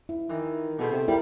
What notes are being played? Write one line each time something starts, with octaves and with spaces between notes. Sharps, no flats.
E4
D#3 E3
B2 A3 G#4 C5
C3
G3 E4 A#4